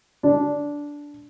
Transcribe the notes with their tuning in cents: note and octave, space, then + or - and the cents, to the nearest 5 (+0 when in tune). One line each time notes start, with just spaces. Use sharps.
D4 -10